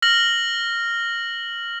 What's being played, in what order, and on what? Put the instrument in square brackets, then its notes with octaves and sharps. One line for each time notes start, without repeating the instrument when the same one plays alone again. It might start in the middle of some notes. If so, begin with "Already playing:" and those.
[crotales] F6 A#6 F#7